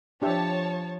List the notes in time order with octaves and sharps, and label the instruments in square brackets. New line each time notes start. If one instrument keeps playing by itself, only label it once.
[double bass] F3 [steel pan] D4 G4 E5 [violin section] C#5 A5